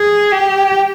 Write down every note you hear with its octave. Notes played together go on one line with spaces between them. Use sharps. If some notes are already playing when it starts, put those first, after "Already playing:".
Already playing: G#4
G4